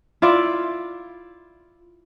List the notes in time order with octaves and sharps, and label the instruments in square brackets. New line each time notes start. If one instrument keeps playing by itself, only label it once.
[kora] E4 F4 D5 E5